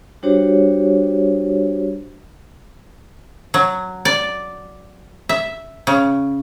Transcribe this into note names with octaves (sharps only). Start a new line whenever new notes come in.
G3 D4 F#4 G4 C5 C#5
F#3
D5
E5
C#3